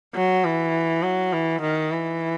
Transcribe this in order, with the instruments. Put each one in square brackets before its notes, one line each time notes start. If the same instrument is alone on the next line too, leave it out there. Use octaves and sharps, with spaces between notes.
[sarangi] F#3
E3
F#3
E3
D#3
E3